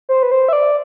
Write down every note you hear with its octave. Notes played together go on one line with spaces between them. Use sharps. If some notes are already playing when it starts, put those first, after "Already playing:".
C5
B4
C5
E5
D5